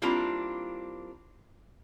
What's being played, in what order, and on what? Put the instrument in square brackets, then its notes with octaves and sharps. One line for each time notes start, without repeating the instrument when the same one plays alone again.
[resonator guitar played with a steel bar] G3 A#3 C4 D4 E4 F4